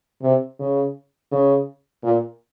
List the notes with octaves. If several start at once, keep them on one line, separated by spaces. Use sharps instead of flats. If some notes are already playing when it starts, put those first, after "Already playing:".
C3
C#3
C#3
A#2